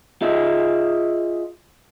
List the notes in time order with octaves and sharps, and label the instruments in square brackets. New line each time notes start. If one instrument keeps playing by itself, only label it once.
[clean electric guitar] F4 G#4 D#5 E5